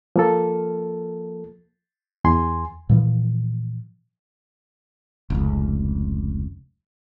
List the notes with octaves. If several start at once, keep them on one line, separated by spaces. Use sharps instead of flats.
F3 A#3 A4
E2 G#5 C6
A#2 E3 F3
F1 C#2